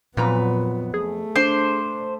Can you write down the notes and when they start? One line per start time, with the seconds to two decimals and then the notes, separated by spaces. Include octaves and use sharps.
0.17 F2 A#2 F#3 B3 B4 A#5
0.94 A3 G#4
1.36 D4 C5